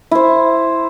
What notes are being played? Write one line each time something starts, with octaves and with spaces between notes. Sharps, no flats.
E4 C5